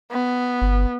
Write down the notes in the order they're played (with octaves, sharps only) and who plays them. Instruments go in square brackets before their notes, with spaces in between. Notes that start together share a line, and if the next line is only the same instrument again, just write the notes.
[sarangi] B3
[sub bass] G1